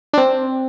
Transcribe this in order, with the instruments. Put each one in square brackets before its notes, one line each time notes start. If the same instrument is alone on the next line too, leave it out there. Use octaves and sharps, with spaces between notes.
[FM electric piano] D4
C4